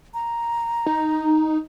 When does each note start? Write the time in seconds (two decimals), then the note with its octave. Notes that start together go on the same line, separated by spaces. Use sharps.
0.14 A#5
0.86 D#4